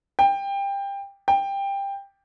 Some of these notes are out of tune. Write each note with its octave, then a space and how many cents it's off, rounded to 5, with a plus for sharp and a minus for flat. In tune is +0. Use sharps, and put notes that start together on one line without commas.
G5 +20
G5 +15